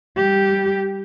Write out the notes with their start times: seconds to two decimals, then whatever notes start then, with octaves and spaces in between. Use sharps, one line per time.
0.16 G3 G4